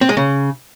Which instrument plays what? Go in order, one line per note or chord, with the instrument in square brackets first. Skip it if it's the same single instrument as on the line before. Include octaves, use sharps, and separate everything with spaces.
[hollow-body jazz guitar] C4
G#3
C#3